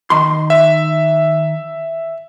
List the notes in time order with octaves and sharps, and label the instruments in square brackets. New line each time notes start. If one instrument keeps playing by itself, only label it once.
[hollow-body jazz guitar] D#3 C6
[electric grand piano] E5